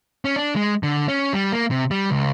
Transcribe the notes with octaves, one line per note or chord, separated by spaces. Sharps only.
C#4
D4
G#3
D3
C#4
G3
A#3
C3
G3
C#2